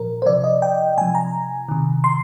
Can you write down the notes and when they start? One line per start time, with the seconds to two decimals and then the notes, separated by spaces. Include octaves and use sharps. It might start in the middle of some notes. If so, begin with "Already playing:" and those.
Already playing: A#2 F3 A#4
0.22 C5
0.26 C3 F3 D5
0.44 D#5
0.62 G5
0.97 C3 F3 G#5
1.15 A#5
1.69 C3 D#3
2.04 C6